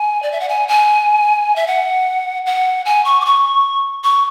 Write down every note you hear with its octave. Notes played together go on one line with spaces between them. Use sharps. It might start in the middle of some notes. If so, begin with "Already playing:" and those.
Already playing: G#5
D5
E5
F#5
G#5
G#5
E5
F#5
F#5
G#5
C#6
D6
C#6
C#6